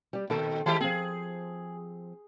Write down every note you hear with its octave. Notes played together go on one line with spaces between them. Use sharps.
G3 G4
A#2 D#3 A4 G5
D#3 G#3 G4 A5
F3 C4 G#4